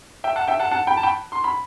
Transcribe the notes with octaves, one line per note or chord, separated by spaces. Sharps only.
E5 G5
F#5 A5
E5 G5
F#5 A5
F#5 A5
G5 B5
A5
G5 B5
C6
B5